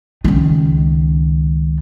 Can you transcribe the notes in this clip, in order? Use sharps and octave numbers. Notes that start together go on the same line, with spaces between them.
C#2 D#3